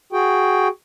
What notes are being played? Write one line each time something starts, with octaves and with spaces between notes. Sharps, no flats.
F#4 G#4 G5